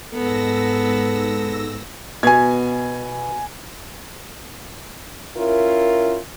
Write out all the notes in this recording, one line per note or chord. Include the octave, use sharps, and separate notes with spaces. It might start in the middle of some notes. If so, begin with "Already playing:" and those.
G#2 B3 A4 E6 A#6
B2 G#5 G#6
C#4 E4 F4 A#4